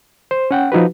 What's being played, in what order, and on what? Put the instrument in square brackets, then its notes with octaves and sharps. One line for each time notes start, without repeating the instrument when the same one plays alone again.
[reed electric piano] C5
C#4 F#5 G5
F3 D#4 F#4 B4